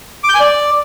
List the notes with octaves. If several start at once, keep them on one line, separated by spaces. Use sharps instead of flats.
D6
G6
G#5
D5